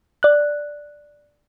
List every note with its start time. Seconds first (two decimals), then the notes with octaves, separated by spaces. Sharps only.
0.23 D5 F#6